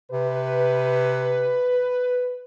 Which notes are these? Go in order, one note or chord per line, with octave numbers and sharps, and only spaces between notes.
C3 B4